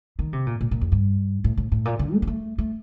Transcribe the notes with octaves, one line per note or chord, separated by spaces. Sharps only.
D#3
C3
A#2
A#2
A#2
F2
G2
A2
A2
A2
A#2
D3
A3
A#3
A3
A3